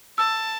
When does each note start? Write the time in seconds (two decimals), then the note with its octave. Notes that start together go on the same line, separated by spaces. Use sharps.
0.18 A5 E6